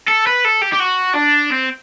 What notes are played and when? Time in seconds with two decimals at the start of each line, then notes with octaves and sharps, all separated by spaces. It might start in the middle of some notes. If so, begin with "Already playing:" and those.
0.08 A4
0.27 B4
0.45 A4
0.62 G4
0.73 G4
0.81 F#4
1.15 D4
1.52 C4